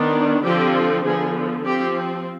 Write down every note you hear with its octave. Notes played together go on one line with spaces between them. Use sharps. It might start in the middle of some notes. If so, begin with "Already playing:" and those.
Already playing: D#3 B3 D4
D3 F3 C4 G4
D3 F3 B3 G#4
F3 C4 G4